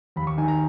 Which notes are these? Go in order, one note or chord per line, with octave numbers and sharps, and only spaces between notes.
D#2 B5
C#6
D#3 G#5
A#5